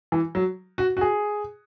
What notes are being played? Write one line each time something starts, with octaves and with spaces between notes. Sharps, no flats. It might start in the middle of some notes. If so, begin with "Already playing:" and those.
E3
F#3
F#4
F#4
G#4